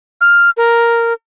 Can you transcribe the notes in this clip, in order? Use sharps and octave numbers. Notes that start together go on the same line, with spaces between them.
F6
A#4